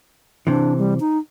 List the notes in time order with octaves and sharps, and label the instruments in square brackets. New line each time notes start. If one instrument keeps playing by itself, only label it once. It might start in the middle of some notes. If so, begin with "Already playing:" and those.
[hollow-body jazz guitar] C3 E3 [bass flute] D4
[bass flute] G3
D#4